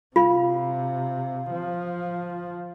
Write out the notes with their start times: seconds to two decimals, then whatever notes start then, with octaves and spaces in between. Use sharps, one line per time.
0.16 C3 F4 F5
1.51 F3